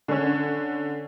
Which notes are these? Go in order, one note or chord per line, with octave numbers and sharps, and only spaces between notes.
D3 C#4